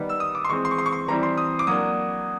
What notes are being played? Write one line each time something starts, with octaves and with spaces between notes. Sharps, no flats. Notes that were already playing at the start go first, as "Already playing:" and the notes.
Already playing: D#3 G3 B3
E6
D#6
D6
C6
E3 G#3 C4 C#6
C6
C#6
C6
C#6
C6
E3 G3 C4 E4 A#5
C6
D#6
D6
F#3 A#3 D4 D#6